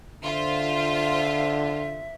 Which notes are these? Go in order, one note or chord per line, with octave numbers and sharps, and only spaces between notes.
D3 F4 C5 E5